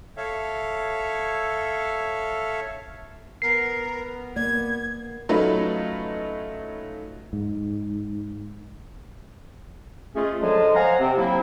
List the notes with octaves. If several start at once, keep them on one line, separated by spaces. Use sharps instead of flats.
A4 C#5 E5 F5
B3 A#4 C7
A#3 D5 G#6
F#3 A3 C#4 D#4 F4 B4
G#2
G#3 A3 C#4 F4 G#4
D3 F3 F#3 G#3
C5 F5 F#5 G#5 A#5
C3 C4
F3 F#3 A#3 C4 E4